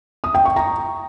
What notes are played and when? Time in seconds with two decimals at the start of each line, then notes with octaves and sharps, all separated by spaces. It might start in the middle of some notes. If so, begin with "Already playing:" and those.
0.24 D#6
0.35 G5
0.45 C#6
0.56 A#5